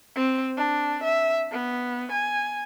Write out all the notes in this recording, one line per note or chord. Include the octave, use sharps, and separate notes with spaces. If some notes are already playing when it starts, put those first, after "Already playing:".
C4
D4
E5
B3
G#5